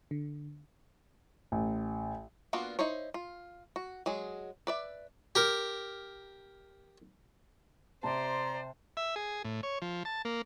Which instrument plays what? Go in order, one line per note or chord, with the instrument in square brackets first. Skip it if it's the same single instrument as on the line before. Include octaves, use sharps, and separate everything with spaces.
[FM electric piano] D3
[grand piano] A1
[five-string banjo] A#3 B3 D4 F4 F#4
D#4 E4 C5 C#5
F4
F#4
F#3 G#3 G#4
B4 D5 E5
[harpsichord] G4 A#4
[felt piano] C3 A5 [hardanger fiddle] C5 [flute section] D5 A#5 C6
[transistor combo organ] E5
G#4
A2
C#5
F3
A5
A#3